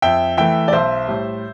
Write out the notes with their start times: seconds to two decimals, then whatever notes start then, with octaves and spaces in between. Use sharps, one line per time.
0.02 F2 E5 G5
0.37 E3 A3 E5 G5
0.68 D5
0.73 B1 C5 E5
1.08 A2 G3